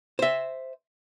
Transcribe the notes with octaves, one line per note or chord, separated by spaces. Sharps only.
C5 E5